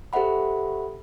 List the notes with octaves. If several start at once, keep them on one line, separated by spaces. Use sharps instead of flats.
G4 A4 C5 E5 F#5 B5